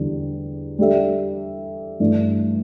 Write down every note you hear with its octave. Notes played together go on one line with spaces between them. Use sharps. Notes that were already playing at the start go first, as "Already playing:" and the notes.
Already playing: E2 D3 G3
G3 D4 A4 E5
G2 E3 A3 D4